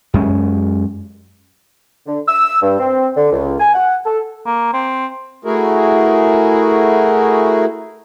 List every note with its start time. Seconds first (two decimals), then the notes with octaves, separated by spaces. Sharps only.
0.14 F#2 G#3 C#4
2.07 D3
2.27 E6
2.62 G2
2.79 C4
3.16 D3
3.32 C#2
3.60 G#5
3.74 F#5
4.05 A4
4.46 A#3
4.73 C4
5.45 A3 E4 F#4 G#4 A#4